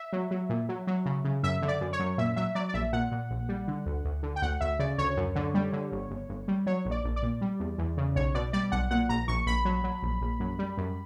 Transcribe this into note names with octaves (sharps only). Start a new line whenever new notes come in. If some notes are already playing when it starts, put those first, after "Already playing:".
Already playing: E5
F#3
F#3
A#2
F#3
F#3
C#3
C#3
F#2 E5
D3
D5
F#2
C#5
F#2
A#2 E5
F#3 E5
F#3 D5
D5
A#1 E5
A#2 F#5
A#2
A#1
G3
D3
D2
D2
D3
G5
D2 F#5
D2 E5
C#3 D5
D2 C#5
F#2
D3
G3
D3
G1
G1
G1
G3
F#3 C#5
A#1
D5
A#1
D5
A#2
G3
E2
E2
C#3
B1 C#5
B2 D5
G3 D5
B1 F#5
A#2 F#5
A#1 A#5
A#1 C#6
A#1 B5
F#3
F#3
A#1
A#1
F#2
G3
F#2